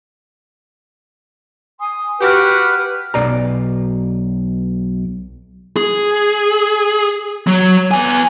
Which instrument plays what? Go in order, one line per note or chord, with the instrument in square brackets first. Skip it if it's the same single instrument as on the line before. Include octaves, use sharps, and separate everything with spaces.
[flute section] G#5 C6 D#6
[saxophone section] F#4 G4 [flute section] B4 F6
[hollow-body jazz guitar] B1 D5 A#5
[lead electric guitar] G#4
F#3
B3 G#5